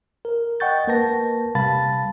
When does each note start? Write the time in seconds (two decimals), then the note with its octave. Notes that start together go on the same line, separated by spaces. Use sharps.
0.25 A#4
0.60 D#5 F#5 G5 C#6 G6 A6
0.87 A#3 A#4 B4 A5 A#6
1.55 C3 G3 F5 A5 B5 A6